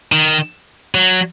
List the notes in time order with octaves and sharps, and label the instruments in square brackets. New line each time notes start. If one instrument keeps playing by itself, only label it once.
[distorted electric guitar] D#3
F#3